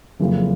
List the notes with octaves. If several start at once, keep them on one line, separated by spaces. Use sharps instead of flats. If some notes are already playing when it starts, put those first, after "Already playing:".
F#1 F2 C#3